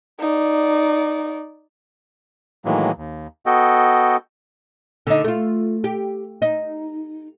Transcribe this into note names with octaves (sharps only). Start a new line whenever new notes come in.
D#4 D5
A2 D#3 E3 F#3 G#3 A#3
D#2
B3 F#4 A4 D#5 G5
D3 D#4
A3 F4
G4
D#4